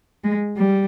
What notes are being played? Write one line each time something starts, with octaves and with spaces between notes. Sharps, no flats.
G#3
G3